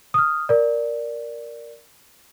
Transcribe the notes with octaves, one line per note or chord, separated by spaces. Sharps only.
D#6 F6
A#4 D5